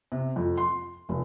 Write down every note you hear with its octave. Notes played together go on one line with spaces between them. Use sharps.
C3
F2
C6
F1